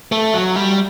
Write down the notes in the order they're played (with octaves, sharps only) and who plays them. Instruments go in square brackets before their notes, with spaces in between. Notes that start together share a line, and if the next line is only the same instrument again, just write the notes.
[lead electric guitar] A3
F#3
G3